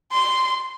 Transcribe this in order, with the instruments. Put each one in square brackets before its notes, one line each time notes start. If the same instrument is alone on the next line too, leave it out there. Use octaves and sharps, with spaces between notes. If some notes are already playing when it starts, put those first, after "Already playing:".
[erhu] C6